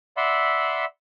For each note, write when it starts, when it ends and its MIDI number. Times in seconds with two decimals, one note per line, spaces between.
0.17 0.85 74
0.17 0.85 76
0.17 0.85 78
0.17 0.85 83
0.17 0.85 84
0.17 0.85 88